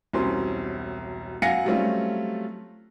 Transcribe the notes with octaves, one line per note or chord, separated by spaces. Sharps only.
E1 C2 C4 C#4 F#4 C6
F#2 F5 F#5 G#5 A#6 C#7
F#3 G3 A3 C4 C#4 F4